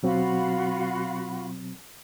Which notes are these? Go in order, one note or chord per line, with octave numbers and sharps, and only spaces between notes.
B2 F#3 C4 F4 F#4 B5